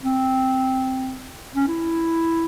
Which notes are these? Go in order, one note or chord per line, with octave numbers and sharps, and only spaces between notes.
C4
C#4
E4